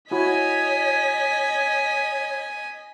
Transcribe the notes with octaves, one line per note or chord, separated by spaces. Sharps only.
E4 F#4 C#5 D#5 G#5 B5 B6